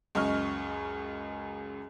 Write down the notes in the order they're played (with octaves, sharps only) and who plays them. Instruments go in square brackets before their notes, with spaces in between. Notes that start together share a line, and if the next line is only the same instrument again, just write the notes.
[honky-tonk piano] C#2 F#2 D#5 C#6 F6